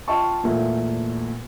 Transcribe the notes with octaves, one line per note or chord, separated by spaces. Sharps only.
F4 D#5 G5 A5 C#6
E2 A#2 A3 A#3